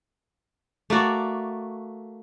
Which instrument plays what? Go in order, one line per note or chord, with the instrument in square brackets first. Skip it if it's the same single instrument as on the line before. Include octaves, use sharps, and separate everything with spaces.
[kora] A3 A#3 F#4 D5